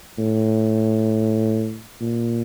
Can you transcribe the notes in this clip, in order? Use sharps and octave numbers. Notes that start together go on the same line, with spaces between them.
A2
A#2